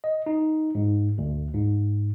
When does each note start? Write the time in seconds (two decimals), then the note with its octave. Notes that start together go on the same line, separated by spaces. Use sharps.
0.04 D#5
0.26 D#4
0.75 G#2
1.18 D2
1.54 G#2